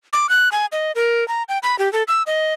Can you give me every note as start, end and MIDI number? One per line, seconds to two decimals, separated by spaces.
0.13 0.29 86
0.29 0.49 90
0.52 0.66 80
0.72 0.92 75
0.95 1.27 70
1.28 1.43 82
1.49 1.58 79
1.63 1.78 83
1.79 1.91 67
1.93 2.03 69
2.08 2.23 88
2.27 2.54 75